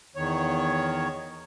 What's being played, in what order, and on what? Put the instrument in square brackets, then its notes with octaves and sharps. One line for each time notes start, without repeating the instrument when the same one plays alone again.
[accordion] E2 D#3 C#5